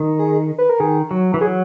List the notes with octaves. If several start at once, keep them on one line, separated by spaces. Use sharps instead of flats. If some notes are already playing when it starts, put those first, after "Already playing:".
Already playing: D#3
G#4
B4
A#4
D#3 G#4
F#3
E3
F#3 G#4